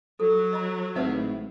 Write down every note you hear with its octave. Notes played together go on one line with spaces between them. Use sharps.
F#3 A4
D#5 A#5
G#1 A2 D#4 B4 E5 F#5